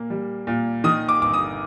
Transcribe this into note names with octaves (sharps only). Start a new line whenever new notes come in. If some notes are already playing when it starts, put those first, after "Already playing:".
Already playing: A#2 A#3
G3
A#2
D#3 D#6
D6
G1 D6
D#6